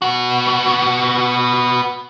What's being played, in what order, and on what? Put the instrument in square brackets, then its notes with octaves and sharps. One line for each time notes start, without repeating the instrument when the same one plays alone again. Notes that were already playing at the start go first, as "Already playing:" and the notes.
[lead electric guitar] B3 F#4